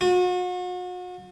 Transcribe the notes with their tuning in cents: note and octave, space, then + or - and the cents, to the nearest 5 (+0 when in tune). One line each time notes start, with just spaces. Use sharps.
F#4 -40